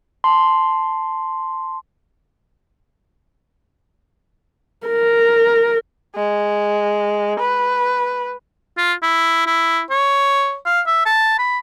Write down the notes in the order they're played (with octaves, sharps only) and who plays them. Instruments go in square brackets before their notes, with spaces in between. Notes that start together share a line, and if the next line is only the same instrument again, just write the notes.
[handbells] A5 C6
[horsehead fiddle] A#4
[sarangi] G#3
B4
[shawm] F4
E4
E4
C#5
F5
E5
A5
B5